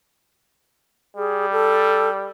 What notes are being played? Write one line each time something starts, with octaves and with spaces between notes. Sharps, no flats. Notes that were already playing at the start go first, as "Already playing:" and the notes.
G3 G#4
A4